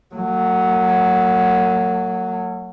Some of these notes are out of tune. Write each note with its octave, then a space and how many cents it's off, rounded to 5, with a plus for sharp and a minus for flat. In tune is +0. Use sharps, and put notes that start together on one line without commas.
F#3 +0 A#3 -45